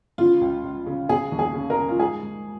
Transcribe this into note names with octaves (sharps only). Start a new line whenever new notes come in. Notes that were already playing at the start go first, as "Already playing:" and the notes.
C#3 F4
C#2
C#2
C#3
C#3 G#4
D#2
G#4
C#3
A#4
C#3
F4
G#2 G#4
G#2